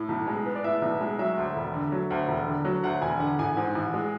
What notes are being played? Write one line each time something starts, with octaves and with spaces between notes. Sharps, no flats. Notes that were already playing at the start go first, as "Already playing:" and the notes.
Already playing: A2
B1
G#3
B3
D5
A2 E5
B1
G#3
F#3 E5
D2
E1
D3
F#3
D2
E1
D3
F#3
D2 F#5
E1 G#5
D3 F#5
A1 G#5
G#2
A1
G#3